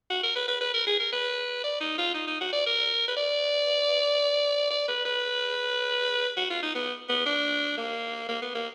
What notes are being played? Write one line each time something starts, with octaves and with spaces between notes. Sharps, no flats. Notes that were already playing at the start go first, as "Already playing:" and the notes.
F#4
A#4
B4
B4
B4
A#4
G#4
A#4
B4
D5
D#4
F4
D#4
D#4
F#4
D5
A#4
B4
D5
D5
B4
B4
F#4
F4
D#4
B3
B3
D4
A#3
A#3
B3
A#3